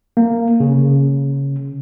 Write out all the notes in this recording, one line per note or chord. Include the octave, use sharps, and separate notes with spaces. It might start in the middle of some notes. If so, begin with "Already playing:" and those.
A#3
C#3